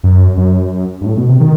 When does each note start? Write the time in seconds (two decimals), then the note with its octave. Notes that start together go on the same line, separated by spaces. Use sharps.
0.03 F#2
0.37 F#2
1.01 G2
1.06 A2
1.17 B2
1.29 C3
1.40 D#3